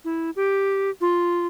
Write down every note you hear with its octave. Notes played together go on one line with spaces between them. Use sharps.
E4
G4
F4